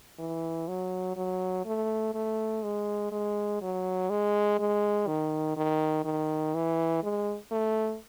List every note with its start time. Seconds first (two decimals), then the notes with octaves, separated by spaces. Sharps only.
0.19 E3
0.68 F#3
1.17 F#3
1.66 A3
2.15 A3
2.64 G#3
3.12 G#3
3.62 F#3
4.10 G#3
4.59 G#3
5.07 D#3
5.57 D#3
6.05 D#3
6.55 E3
7.04 G#3
7.52 A3